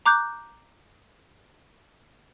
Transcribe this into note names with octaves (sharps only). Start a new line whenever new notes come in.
A#5 D6 F#6 G6